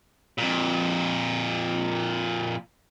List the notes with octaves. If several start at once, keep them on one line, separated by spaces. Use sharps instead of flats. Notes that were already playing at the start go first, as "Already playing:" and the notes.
F2 A#2